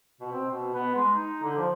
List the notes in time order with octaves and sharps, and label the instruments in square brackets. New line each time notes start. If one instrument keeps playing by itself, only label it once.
[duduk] B2
C4
B2
B3
G#3
D#4
D3
F3